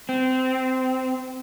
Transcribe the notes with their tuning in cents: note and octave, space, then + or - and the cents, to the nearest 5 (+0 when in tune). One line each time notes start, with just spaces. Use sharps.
C4 -20